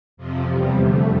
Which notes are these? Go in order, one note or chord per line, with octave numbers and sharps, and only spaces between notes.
F2 C3 F3
E2 C3 G3
F2 D3 A3